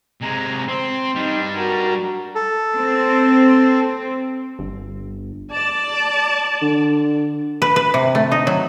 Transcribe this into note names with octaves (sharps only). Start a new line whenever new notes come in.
C3 G#3 A#5
C4 C6
G3 D4 D#4 G5
F#4 A#4 A#5
A4
C4
G1
D5 A5
D3
B4
B4
C3
A3
D#4
F#3